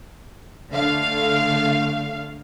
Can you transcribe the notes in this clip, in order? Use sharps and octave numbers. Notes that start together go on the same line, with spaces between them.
D3 A3 F5